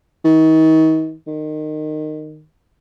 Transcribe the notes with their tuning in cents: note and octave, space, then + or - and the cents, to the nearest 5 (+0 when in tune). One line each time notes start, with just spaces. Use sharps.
D#3 +35
D#3 -20